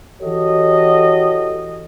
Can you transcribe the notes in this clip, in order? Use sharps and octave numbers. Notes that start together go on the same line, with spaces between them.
E3 F#4 G4 A4 C#5 D#5